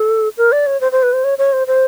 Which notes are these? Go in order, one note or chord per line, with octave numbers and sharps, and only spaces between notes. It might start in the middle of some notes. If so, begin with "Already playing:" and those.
Already playing: A4
A#4
D5
C#5
C5
C5
B4
C5
C#5
C#5
C5
C5